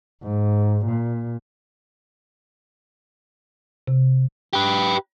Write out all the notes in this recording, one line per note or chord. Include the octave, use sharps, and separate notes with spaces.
G#2
A#2
C3
G4 B4